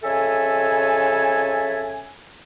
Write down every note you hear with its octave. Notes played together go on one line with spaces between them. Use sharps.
F2 C#3 A4 E5 G#5